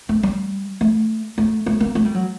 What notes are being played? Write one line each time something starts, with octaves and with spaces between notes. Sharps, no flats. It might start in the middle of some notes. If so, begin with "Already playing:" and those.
A3
G3
A3
A3
A3
A#3
A3
G3
F#3